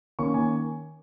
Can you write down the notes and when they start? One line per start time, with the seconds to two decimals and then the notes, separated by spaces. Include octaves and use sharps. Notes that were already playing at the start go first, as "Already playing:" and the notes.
0.19 D#3 A#3 C#4 C#6
0.34 G#5